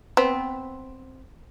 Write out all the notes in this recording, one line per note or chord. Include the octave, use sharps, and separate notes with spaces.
B3 C4